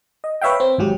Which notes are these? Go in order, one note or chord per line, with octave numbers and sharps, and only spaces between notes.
D#5
B4 C#5 E5 F5 G5
C4
G#1 G#2 F#3 G4